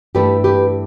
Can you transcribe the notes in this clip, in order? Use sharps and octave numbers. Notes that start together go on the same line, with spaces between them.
G2 E3 A3 D4 G4 B4
G4 B4